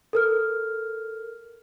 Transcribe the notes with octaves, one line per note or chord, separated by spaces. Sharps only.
A4 A#4 F6